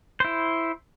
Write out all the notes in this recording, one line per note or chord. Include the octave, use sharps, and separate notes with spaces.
E4 C5